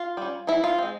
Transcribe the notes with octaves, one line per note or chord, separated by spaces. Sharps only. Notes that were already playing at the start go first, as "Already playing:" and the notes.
Already playing: F4
G3 C#4
E3 E4
F4
G#3 C4